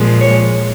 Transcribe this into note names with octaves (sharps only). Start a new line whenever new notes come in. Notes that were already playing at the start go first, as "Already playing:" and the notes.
Already playing: A#2 F3 G#3
C#5